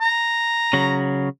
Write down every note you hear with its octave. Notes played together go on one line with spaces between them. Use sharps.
A#5
C#3 F#3